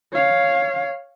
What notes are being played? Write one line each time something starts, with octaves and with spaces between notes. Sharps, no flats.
C#5 F5